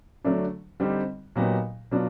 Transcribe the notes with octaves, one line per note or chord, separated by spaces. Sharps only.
D3 F#3 A3 D4
D3 G3 C4 D#4 G4
A#2 F#3 B3 D#4 G4
B2 F#3 B3 D4 F4